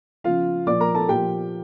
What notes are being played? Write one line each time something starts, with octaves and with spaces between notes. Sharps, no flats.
C#3 F3 F4 F5
A#2 F3 D5 D6
A#4 A#5
A4 A5
A#2 F3 G4 G5